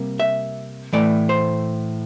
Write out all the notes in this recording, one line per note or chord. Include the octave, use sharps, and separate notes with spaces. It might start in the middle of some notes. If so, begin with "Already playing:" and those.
Already playing: C3 G3 A#3
E5
A2 E3 A3 D5
C5